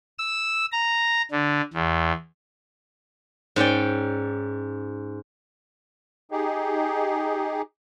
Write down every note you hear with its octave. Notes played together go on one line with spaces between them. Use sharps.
E6
A#5
D3
E2
G#2 C#4 D5 G5
D#4 G4 G#4